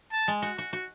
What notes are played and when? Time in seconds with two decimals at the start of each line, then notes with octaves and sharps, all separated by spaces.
0.12 A5
0.28 G#3
0.42 F#4
0.58 F#4
0.73 F#4